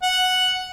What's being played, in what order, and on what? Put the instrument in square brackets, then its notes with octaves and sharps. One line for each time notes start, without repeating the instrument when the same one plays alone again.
[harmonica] F#5